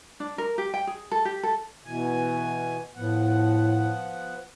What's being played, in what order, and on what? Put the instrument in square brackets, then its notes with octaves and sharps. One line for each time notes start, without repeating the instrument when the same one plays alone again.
[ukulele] D4
A#4
G4
G5
G#4
A4
G4
A4
[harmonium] B2 E3 G#5
[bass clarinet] A2 [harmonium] F3 B3 F#5